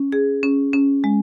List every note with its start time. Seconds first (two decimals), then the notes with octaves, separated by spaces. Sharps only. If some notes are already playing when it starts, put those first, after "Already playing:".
Already playing: C#4
0.12 G#4
0.43 C#4
0.73 C#4
1.04 G#3